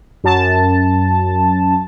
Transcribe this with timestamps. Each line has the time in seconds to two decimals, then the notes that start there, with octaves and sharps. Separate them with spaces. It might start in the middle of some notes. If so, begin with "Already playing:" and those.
0.24 F#2 A5